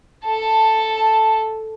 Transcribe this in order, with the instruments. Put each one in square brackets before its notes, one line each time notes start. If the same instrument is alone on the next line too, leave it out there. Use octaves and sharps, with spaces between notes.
[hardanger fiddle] A4 A5